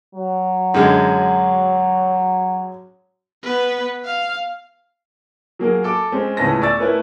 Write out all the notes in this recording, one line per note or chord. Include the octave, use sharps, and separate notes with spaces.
F#3
F#2 D3 G#3
B3 B4
F5
F#3 A#3 G#4 A#4
A4 D6
G#3 C4 C#4
C#2 A2 B3 C#4 A5 A#6
D5 G#5 C#6 E6 A6
A3 E4 A#4 B4 C#5